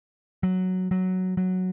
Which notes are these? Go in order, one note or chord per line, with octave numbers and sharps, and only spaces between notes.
F#3
F#3
F#3